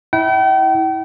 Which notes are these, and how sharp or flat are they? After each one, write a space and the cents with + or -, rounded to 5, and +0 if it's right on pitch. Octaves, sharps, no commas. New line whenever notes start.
E4 -25 G5 -40